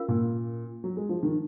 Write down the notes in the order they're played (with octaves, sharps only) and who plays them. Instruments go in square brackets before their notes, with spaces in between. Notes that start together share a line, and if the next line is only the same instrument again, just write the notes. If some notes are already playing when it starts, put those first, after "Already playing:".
Already playing: [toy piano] C#4 F4 A#4 F5
[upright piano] A#2
F#3
G#3
F3
D#3